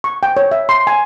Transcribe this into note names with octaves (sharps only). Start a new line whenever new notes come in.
C#6
G5
C#5
E5
C6
G#5